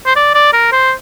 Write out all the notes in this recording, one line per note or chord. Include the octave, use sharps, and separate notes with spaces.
C5
D5
D5
A#4
C5